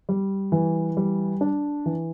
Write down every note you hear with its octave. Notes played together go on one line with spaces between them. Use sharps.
G3
E3
G3
D4
E3